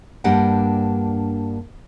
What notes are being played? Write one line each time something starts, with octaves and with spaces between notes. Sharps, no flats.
G2 A#3 D4 G4 F#5